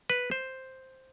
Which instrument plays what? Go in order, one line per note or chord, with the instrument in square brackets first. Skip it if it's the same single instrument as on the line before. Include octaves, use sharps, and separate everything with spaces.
[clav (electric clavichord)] B4
C5